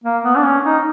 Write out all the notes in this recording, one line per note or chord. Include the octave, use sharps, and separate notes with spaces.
A#3
B3
D4
C#4
D#4